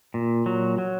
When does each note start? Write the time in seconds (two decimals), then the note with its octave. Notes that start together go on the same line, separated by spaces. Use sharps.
0.14 A#2
0.46 F#3
0.78 F#3